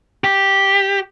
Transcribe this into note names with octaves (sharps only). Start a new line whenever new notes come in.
G4